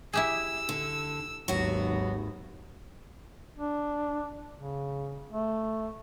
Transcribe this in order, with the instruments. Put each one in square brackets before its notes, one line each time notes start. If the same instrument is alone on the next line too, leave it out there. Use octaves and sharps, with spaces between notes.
[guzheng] E4 G4 G#4 [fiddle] E6
[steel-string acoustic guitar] D3
[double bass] G#1 D#2 [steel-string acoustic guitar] F#3 F#4 [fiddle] B3
[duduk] D4
C#3
A3